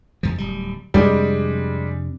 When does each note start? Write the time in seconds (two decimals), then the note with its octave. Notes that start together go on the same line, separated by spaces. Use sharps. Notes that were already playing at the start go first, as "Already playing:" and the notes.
0.23 F2 F3
0.38 D1 G3
0.94 F2 C3 G3 G#3 D4